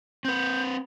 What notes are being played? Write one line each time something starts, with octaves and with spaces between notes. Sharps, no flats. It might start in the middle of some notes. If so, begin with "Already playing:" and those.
C4 B4 G6